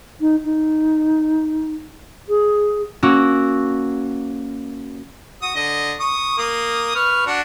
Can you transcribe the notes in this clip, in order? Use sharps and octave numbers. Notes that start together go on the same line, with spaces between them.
D#4
D#4
G#4
A#3 C#4 F#4 E6
F#4 D#6
D3 D#5
C#6 D#6
A#3 D#6
B4 C#6 F6
D4 F#4 F#5